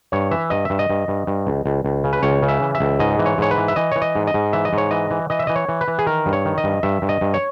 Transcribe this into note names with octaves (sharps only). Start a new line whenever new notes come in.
G2 C#5
E3 E5
G2 D#5
G2 E5
D#5
G2
G2
G2
C#2
C#2
C#2
C#3
B4
C#2 C#5
C#3
E5
E3
E5
C#2
G#2 D#5
E3
C#5
G#2 C#5
B4
E3
E5
E3 D#5
E3 C#5
D#5
G#2
D#5
G#2
E3 E5
D#5
G#2
C#5
E3 D#5
E3
E3 D#5
E5
E3 D#5
C#5
E3
B4
E3
G#4
D#3 A#4
G2
C#5
D#3
D#5
G2
G2 E5
G2
D#5
G2
C#5